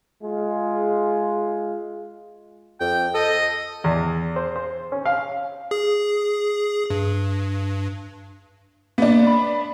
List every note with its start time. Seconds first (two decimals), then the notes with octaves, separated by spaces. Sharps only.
0.22 G#3 F4
2.80 F2 G5
3.14 A4 D#5
3.84 E2
4.36 C5
4.56 C5
4.92 C#4
5.06 F5
5.71 G#4
6.90 G2
8.98 A#3 B3 D4
9.27 B5